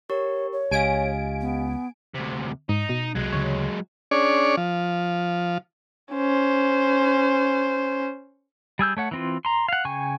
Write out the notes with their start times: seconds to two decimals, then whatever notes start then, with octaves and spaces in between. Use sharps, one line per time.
0.10 G4 A#4 C#5 C#6
0.52 C#5
0.71 C#2 G4 D#5 F5 G#5 D7
1.41 B3
2.15 D2 C3
2.69 G#2 D#4
2.89 B2
3.15 C2 F#3 G#3
3.33 D2 C#3 C#5
4.11 C#4 D4 G#4 C#5 D5
4.57 F3
6.14 C#4 C5
8.79 G3 G#4 E6 G6
8.97 A3 C#5 F#5
9.11 E3 C4 F4
9.45 A#5 C6
9.68 F5 F#5
9.85 C#3 G5 G#5 C#6